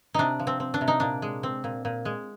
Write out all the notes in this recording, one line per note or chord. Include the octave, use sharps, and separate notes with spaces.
C3 D4 D#4
F3
C4
C4
D4
C3
D#4
A#2 D4
G#3
C4
A#2
A#2
G#3